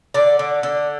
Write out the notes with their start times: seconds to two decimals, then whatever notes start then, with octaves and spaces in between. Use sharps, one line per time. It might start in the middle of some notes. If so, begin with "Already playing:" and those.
0.14 D3 D5
0.39 D3
0.63 D3